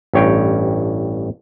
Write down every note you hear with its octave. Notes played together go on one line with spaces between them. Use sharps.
A1 G2 C#5 G5